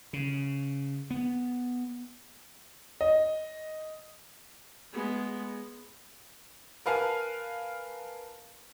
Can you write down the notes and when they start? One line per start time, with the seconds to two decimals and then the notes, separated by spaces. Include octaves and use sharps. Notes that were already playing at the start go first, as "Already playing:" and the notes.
0.13 C#3
1.10 B3
3.01 D#5
4.93 G#3 B3
6.86 A#4 B4 F5 G#5 A5